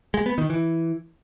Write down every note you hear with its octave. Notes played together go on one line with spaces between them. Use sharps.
G#3
B3
D#3
E3